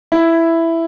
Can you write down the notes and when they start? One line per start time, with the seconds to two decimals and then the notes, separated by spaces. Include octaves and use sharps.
0.12 E4